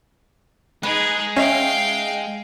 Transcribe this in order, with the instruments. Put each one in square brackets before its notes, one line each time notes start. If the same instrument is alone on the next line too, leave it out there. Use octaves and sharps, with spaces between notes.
[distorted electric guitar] G#3 [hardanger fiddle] D#4 G#4 [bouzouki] B4
[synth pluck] C#4 [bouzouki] D#4 E5 [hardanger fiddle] F5 G5